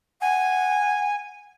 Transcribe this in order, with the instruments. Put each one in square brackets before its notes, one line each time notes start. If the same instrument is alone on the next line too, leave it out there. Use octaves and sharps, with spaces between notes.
[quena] F#5 [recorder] G#5